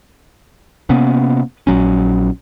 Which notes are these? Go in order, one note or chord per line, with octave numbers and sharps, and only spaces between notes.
C3 A#3 B3 C#4
A#1 F#3 C#4